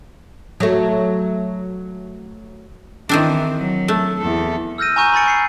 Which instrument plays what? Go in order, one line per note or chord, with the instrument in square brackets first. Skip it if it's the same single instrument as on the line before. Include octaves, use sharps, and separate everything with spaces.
[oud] F#3 A3
[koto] D#3 C4 D4 [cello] E3
[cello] F#3
[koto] A3
[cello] E2 A4
[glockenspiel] E6 F6 G6 A#6 D#7
G#5 A#5 C#6 G6 D#7
B5 C#6 A6 C#7 D7
C7 C#7